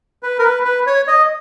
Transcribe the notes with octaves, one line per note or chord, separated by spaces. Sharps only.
B4
A#4
B4
B4
C#5
D#5